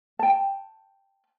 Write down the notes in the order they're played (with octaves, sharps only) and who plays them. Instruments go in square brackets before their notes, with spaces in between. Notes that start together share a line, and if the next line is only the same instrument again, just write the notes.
[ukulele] G5 A5